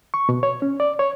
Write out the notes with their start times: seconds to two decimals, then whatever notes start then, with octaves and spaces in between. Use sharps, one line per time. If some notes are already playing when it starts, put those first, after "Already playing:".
0.14 C#6
0.29 B2
0.43 C#5
0.62 C#4
0.80 D5
0.99 C#5